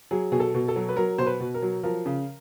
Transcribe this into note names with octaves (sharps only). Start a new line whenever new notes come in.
F#3 G#4
B2 G#4
A4
B2
A4
F#3
B4
F#3 A#4
B2 C5
B4
B2
A#4
F#3
F3 A#4
C#3